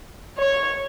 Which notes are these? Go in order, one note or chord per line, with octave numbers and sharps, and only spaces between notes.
C#5